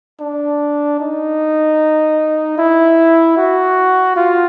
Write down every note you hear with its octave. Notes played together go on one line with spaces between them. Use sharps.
D4
D#4
E4
F#4
F4